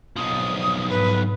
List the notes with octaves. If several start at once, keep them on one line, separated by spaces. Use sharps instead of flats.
B1 F3 D#6
G#2 B4